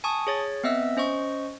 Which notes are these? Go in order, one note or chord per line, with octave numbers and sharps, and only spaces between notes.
G#5 A5 C#6 D#6
G#4 C#5 A6
B3 C4 D#5 E5 E6
C#4 C5 D#5 C#6